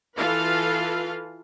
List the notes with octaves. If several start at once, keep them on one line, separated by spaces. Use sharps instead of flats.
E3 F4 A4 B4 F5